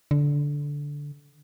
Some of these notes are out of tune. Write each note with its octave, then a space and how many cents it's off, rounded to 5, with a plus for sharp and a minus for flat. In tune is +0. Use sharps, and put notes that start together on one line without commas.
D3 -15